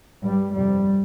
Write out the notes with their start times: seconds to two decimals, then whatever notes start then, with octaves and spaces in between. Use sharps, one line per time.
0.24 G2 G3
0.55 F2 C3 G3